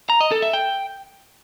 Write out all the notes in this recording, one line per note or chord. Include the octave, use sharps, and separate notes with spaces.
A#5
D#5
A4
E5
G5